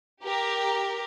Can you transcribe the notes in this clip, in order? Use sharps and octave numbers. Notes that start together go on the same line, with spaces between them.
G4 A#4